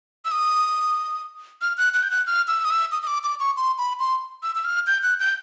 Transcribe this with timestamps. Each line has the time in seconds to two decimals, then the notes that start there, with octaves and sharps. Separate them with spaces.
0.25 E6
0.31 D#6
1.62 F6
1.78 F#6
1.94 F#6
2.03 G6
2.11 F#6
2.27 F6
2.48 E6
2.65 D#6
2.71 E6
2.92 D#6
3.02 D#6
3.07 D6
3.24 D6
3.40 C#6
3.57 C6
3.78 B5
4.00 C6
4.43 E6
4.55 E6
4.65 F6
4.87 G6
5.03 F#6
5.20 G6